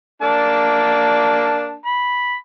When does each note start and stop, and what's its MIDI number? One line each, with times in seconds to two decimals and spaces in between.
0.22 1.76 58
0.22 1.76 62
0.22 1.76 81
1.86 2.35 83